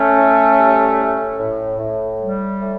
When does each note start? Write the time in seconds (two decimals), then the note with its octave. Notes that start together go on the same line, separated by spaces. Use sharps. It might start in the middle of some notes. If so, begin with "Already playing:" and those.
Already playing: A3 C#4
0.17 A2
0.58 G3
0.99 A2
1.39 A2
1.79 A2
2.20 G3
2.62 A2